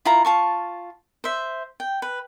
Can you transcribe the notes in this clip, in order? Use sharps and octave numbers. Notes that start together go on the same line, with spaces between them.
E4 F4 A#5
F4 A5 C#6
C5 E5
G5
B4